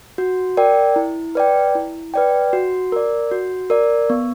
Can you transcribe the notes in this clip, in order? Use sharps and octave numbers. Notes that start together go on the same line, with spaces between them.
F#4
A#4 D5 G5
E4
B4 D5 G5
E4
B4 D5 G5
F#4
A#4 D5
F#4
A#4 D5
B3